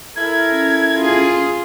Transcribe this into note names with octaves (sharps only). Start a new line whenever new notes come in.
E4 A4 A#4 G#6
C#4
F4 G#4